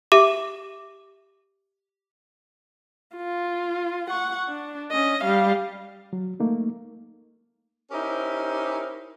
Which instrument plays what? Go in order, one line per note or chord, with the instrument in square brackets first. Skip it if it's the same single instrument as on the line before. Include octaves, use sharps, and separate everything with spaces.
[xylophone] G4 E5 D6 E7
[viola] F4
F#5 C#6
D4
C#4 D#5
G3 F5
[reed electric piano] F#3
A3 A#3 D#4
[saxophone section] C#4 D#4 E4 G4 A#4 C5